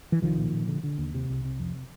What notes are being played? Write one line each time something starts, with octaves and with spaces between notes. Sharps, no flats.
E3
C2 D#3 F3
A#2
A#2
D3
D3
D#2
C3
C2
C3
F2